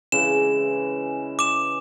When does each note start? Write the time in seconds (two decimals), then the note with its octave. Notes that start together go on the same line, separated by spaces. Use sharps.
0.12 C#3 E3 G#3 E7
1.39 D6 E7